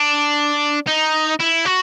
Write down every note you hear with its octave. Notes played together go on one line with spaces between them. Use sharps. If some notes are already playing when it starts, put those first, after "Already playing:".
Already playing: D4
D#4
E4
F#4